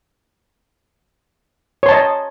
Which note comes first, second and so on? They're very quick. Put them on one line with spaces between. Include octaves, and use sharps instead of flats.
C#5 C6 A5 D#5